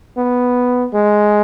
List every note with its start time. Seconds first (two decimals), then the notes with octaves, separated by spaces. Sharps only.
0.17 B3
0.94 G#3